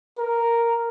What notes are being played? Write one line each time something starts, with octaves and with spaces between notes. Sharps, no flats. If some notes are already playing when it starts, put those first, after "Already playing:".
A#4